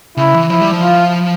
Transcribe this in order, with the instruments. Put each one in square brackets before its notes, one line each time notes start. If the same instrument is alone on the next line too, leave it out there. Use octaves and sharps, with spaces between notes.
[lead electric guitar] C#3 [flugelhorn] E4
[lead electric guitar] E3
[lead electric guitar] F3 [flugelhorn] E4
[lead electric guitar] G3
F3
[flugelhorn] F4